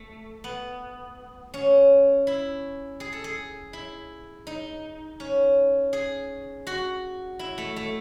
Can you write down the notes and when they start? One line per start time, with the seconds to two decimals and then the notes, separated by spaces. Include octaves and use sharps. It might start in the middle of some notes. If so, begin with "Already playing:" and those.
Already playing: A3
0.44 B3
1.54 C#4
2.27 E4
3.00 G#4
3.13 A4
3.24 G#4
3.73 E4
4.47 D#4
5.20 C#4
5.93 G#4
6.67 F#4
7.39 E4
7.58 A3
7.76 A3